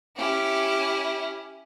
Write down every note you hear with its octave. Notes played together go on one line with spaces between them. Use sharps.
C#4 E4 G4